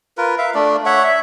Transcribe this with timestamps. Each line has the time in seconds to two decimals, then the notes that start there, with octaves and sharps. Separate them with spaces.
0.18 F4 A#4 B4
0.38 E5 F5
0.55 A3 D4 D5
0.86 C#5 E5 F#5
1.04 E5